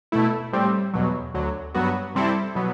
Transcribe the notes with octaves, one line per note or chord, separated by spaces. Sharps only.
B2 A3 E4
A2 G3 C4
E2 B2 F#3
D2 D3 F#3
G2 F#3 B3 F#4
C3 G3 C4 E4 A4
B2 F#3 B3